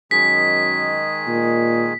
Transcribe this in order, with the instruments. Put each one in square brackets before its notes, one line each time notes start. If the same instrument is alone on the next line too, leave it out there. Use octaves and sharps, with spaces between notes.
[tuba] F#2 [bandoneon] D#3 G#3 G#4 [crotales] B6
[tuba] A#2